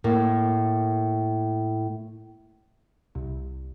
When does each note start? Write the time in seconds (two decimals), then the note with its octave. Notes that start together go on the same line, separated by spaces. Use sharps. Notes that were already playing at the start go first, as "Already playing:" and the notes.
0.04 A2 A#3
3.15 C2